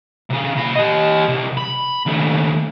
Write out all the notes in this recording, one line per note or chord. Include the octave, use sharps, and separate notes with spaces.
C3 G#4
A#2 B5
G4 D#5
C2
B5
D#2 A3